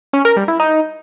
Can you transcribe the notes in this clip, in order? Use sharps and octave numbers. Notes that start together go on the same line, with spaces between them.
C#4
A#4
G3
E4
D#4